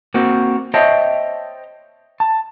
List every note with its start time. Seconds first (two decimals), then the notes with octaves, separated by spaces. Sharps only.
0.14 A#3 C4 F#4
0.74 C5 C#5 D#5 E5 G5 A5
2.20 A5